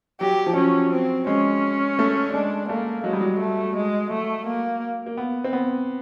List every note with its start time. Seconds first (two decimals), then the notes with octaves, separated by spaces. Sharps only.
0.21 F#3 G4
0.47 F3
0.56 F#3 C#4
0.92 C4
1.27 G#3 C#4
1.99 A3
2.33 G#3 D4
2.69 A3 A#3
3.04 F#3 G#3
3.13 G3
3.21 F#3
3.39 A3
3.76 G#3
4.10 F#3 A3
4.47 A#3
5.06 A#3
5.17 B3
5.44 C4
5.53 B3